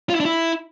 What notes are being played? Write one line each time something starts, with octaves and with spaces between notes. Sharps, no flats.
F4
E4
D4
E4